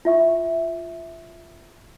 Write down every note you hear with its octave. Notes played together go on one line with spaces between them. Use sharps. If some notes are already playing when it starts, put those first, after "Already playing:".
F4 E5 C#6